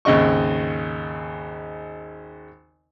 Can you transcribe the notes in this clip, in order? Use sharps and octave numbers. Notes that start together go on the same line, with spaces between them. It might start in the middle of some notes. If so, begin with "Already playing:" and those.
G#1 D#2 C#3 D#5 C#6